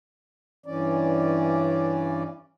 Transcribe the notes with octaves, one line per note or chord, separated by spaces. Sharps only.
G2 E3 C#4 D5